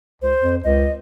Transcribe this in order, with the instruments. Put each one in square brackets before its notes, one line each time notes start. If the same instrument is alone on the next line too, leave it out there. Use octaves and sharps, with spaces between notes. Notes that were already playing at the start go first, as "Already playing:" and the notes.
[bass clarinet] C#2 [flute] C5
[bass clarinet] F2
[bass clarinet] C#2 [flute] D#5